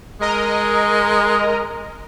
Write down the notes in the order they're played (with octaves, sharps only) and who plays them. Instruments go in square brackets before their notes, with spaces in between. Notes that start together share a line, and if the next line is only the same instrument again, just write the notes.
[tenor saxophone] G#3 [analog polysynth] A#4 D#5 A#5